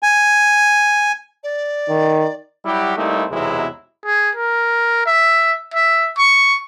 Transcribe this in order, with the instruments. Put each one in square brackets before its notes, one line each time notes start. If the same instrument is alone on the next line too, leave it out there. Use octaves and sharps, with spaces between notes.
[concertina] G#5
[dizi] D5
[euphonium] D#3
[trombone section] F#3 G3 E4 F#4 G4
G3 A3 A#3 C4 D#4 E4
B1 E2 C3 F#3 G#3 E4
[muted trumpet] G#4
A#4
E5
E5
C#6